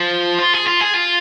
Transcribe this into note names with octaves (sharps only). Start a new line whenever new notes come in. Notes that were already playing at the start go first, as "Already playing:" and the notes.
Already playing: F3
F4
G#4
F4
G#4
F4